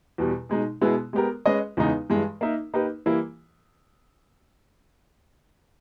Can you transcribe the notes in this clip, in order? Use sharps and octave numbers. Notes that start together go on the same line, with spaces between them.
E2 B2 G3
B2 G#3 D#4
B2 G#3 B3 E4 G#4
G#3 B3 G4 A#4
G#3 C#4 G#4 B4 D#5
E2 C#3 G#3 B3 D#4
G2 E3 G#3
A#3 D#4 A#4 E5
A#3 D#4 G4 B4
E3 G3 A#3 E4